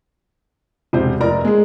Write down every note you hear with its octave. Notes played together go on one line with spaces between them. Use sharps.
E1 C3 C5
F1 A#4 D5 A#5
G#3 G#4